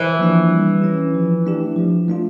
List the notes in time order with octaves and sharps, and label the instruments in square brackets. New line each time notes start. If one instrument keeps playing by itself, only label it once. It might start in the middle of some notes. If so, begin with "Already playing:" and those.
Already playing: [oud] E3
[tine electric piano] F3 A#3 D4
G3
C#4 E4 G4
F3
A3 D4 G4
F3
A3 D4 F4